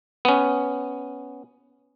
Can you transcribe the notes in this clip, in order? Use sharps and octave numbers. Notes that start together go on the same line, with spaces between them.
B3 C#4